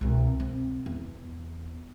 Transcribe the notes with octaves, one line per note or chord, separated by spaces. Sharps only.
C2 B2
C4
E2